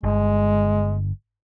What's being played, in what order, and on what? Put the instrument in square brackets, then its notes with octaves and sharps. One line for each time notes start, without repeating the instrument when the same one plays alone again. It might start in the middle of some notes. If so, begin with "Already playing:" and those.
[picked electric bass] G1 [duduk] G#3